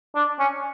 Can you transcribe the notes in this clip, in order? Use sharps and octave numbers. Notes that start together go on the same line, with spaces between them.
D4
C#4